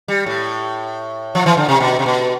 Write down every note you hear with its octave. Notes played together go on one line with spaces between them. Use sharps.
G3
A2
F3
E3
D3
C3
B2
C3
B2